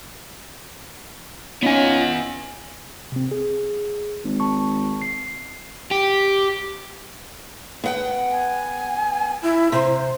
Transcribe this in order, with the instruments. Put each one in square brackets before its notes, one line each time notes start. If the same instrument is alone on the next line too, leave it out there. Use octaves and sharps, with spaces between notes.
[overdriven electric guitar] B3 G#5 [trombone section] C#4 D#4 F4
[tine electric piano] C3 C4
G#4
[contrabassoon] G#1
[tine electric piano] A5 C#6
C7
[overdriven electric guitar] G4
[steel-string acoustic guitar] B3 F#5 G5
[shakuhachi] G#5
E4
[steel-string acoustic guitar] C3 [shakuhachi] C5